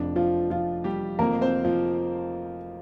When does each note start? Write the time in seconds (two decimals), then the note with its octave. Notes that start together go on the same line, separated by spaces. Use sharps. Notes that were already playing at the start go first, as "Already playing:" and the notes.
Already playing: F1 F2 F3 D4
0.16 F3 F4
0.50 F3 F4
0.84 G3 G4
1.19 F1 F2 F3 A#3 A#4
1.41 C4 C5
1.65 F3